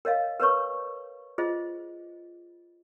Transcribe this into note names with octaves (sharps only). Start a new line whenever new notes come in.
A#4 C#5 D#5 F5
A#4 B4 C#5 C#6
F4 G#4 C5 D#5